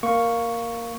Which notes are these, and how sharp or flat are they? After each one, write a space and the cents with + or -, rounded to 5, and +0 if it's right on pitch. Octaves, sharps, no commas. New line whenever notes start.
A#3 +0 C#6 +0